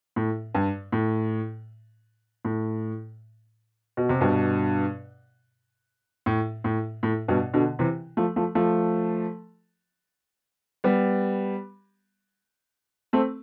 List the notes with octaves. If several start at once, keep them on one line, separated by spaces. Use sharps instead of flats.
A2
G2
A2
A2
B2
C3
G2 B2
A2
A2
A2
G2 B2
B2 D3
C3 E3
F3 A3
F3 A3
F3 A3
G3 B3
A3 C4